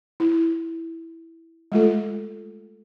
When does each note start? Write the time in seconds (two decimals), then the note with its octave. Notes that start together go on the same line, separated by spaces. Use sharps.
0.20 E4
1.72 G#3 A3 F4 A4